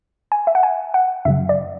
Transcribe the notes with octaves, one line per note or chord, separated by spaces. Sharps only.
G#5
E5
F#5
G#5
F#5
F#2 C#3 F#3 E5
D5